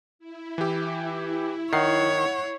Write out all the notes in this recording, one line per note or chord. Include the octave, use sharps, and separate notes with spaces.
E4
E3 G4
D#3 C#5 F#5 C7